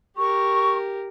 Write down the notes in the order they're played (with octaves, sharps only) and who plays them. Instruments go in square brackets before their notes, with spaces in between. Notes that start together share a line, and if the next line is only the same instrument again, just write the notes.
[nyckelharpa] G4 A#4 [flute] C#6